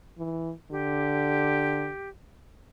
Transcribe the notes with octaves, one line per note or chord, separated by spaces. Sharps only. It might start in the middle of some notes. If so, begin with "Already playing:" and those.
E3
D3 G4